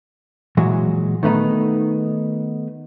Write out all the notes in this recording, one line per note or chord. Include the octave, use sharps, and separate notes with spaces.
A#2 E3 F#3 G#3 F#4
D#3 A3 B3 D#4